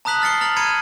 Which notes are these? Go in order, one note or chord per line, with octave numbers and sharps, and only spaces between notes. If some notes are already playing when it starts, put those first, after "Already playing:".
A5 A#5 D#6 F#6 B6 F#7
F6 A6 C7 C#7 G7
A#5 F6 A6 F#7
A#5 B5 G#6 C#7 D#7